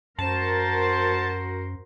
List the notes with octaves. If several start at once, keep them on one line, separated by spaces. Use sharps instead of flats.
F#2 F#4 A#4 C5 A5